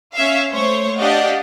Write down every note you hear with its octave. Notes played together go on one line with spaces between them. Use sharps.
C#4 E5 F5
A3 C5 C#5
D4 G4 D5 D#5 F5 F#5